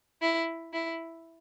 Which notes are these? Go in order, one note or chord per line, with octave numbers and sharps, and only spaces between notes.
E4
E4